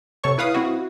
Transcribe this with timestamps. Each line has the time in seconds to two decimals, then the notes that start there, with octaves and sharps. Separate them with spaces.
0.23 C3 A4 C#5 C#6
0.38 E4 B4 F5 D#6
0.54 C4 E4 F#4